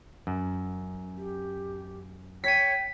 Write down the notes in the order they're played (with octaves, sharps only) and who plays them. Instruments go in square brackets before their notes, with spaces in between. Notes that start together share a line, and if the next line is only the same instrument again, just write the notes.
[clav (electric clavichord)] F#2
[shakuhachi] G4
[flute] C#5 [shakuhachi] G5 [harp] B6 D#7